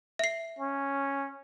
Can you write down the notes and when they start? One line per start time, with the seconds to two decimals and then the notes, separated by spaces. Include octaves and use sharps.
0.19 E5 C7
0.59 C#4